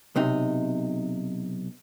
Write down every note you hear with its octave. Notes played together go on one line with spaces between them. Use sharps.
B1 C3 D#4